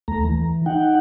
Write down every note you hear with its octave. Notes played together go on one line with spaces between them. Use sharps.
D#2 A3 A#5
E3
D#4 F#5 G5